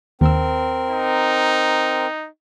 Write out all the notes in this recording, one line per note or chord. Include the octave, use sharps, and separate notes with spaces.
D#2 C4 A#4 E6
D#4